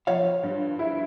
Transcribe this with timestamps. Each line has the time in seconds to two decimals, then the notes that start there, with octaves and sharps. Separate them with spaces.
0.07 F3 C#5 F5
0.43 G2
0.79 E4